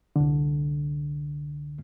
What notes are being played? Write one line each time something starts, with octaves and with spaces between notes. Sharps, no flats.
C2 D3